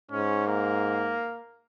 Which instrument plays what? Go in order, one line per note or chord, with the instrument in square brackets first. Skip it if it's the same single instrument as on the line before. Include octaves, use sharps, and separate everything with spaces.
[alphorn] G#2 [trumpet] C#4
[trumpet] A#3